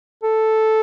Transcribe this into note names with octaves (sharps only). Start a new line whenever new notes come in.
A4